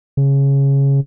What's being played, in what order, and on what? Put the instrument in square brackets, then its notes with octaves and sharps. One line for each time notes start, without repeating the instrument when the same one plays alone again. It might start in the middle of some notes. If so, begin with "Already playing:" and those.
[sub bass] C#3